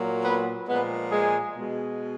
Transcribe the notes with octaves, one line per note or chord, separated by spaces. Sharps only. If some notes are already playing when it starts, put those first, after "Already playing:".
Already playing: A#2 F#3 A#3
B3 B4
A#2 F3 G#3 B3 B4
G#3 G#4
B2 G#3